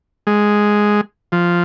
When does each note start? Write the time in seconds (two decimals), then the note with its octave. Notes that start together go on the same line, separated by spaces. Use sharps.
0.27 G#3
1.32 F3